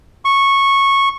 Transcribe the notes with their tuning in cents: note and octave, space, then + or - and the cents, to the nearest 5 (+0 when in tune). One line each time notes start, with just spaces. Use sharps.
C#6 -10